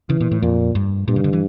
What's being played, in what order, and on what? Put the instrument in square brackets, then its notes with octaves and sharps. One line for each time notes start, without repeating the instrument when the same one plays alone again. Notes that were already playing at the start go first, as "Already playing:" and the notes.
[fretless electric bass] C#3 [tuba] E3
[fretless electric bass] A#2
A2
[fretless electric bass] F2 [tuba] A#2
[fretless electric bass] G2
[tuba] G2 [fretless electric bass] A#2
[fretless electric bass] C#3
D3
E3